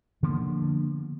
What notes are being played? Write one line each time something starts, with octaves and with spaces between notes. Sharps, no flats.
D3 F3 A#3 B3